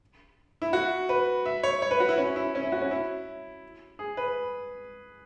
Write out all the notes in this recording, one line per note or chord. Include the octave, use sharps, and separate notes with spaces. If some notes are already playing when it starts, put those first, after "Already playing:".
E4
F#4
B4
E5
C#5
C#5
B4
F#4
E4
C#4
E4
C#4
E4
F#4
C#4
E4
G#4
B4